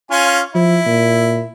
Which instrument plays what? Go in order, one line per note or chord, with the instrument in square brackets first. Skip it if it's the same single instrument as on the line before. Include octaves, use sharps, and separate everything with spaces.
[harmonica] C#4 F4 G#5
[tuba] F3 [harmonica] E4
[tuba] A#2